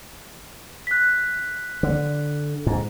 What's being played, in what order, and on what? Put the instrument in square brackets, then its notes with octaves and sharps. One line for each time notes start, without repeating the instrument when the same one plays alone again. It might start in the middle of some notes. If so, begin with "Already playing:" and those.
[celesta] F#6 B6
[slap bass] D3
G#2